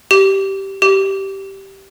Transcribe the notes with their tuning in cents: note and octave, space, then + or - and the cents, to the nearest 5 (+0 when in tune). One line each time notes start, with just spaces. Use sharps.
G4 -10
G4 -10